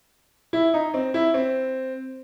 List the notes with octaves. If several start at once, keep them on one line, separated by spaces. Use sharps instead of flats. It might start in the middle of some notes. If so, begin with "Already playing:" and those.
E4
D#4
C4
E4
C4